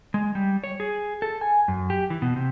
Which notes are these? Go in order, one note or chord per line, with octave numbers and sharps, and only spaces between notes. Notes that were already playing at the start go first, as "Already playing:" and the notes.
G#3
G3
C#5
G#4
A4
G#5
F#2
G4
E3
B2
C3